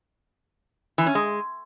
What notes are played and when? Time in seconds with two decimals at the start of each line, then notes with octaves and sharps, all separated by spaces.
0.98 E3
1.07 C#4
1.15 G#3